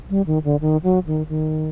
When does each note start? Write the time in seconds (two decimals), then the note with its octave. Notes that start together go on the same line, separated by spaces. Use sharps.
0.10 G3
0.27 D#3
0.44 D3
0.61 D#3
0.83 F#3
1.07 D#3
1.29 D#3